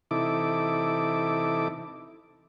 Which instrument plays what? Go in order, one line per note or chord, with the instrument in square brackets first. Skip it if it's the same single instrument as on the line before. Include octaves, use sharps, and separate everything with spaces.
[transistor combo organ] C3 E3 D#4 E4 A4 D6